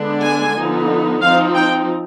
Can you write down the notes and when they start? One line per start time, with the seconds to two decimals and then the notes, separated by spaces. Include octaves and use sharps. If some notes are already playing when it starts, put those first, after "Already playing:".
Already playing: D3 G#3 B3 D4
0.24 G#5
0.56 D3 F3 B3 D#4
1.21 F3 C4 D#4 F5
1.54 G5